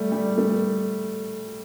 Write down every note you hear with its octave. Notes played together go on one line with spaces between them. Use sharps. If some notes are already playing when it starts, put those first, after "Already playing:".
Already playing: G3 A3
G3
A3